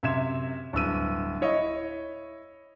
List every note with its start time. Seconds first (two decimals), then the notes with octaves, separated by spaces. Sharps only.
0.03 F#2 C3 E5 C6 G#6 E7
0.73 D1 G2 E6 D#7
1.41 E4 C#5 D#5 E5